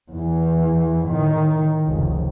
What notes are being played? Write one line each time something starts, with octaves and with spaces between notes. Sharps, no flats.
E2 E3
A2 D#3
F1 C#2